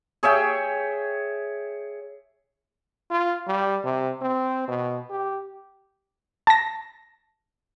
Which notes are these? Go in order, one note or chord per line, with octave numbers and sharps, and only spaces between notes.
G#4 C#5 E5 G5
F4
G3
C3
C4
B2
G4
A5 A#6